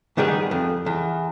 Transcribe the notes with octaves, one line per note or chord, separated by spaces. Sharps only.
G#2 D#3 G3 B3 G#4
F2
E2